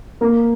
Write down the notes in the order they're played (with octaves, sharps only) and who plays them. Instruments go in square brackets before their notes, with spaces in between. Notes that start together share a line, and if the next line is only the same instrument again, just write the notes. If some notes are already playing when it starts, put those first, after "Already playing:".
[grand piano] A#3